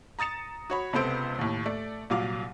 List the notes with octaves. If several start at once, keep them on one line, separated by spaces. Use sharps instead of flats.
A#5 D#6 A6 C#7 E7
F#4 C#5 B5
C#2 C3 B3 A4 C5 D7
D#2 A2
A3 D5
C2 A#2 F#3 F5 D6